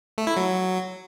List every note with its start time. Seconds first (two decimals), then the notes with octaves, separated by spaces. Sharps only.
0.18 A3
0.27 E4
0.37 F#3